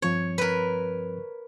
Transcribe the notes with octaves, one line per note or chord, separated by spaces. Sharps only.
G2 F3 C4 C#5
A#4 B4